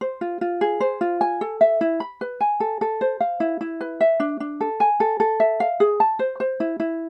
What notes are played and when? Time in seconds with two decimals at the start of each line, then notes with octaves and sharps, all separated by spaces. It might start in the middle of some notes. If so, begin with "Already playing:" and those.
0.01 C5
0.21 F4
0.41 F4
0.61 G#4
0.80 C5
1.01 F4
1.21 G#5
1.41 A4
1.61 E5
1.81 E4
2.00 B5
2.21 B4
2.41 G#5
2.60 A4
2.81 A4
3.01 C5
3.20 F5
3.40 E4
3.61 E4
3.81 B4
4.01 E5
4.20 D4
4.40 D4
4.61 A4
4.80 G#5
5.00 A4
5.20 A4
5.40 E5
5.60 F5
5.80 G#4
6.00 A5
6.19 C5
6.40 C5
6.60 E4
6.80 E4